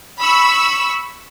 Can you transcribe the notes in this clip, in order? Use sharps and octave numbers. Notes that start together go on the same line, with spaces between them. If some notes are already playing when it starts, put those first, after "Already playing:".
B5 C#6 E6